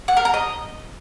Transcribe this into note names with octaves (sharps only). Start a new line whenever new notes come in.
F#5
A#4
A#5
D#5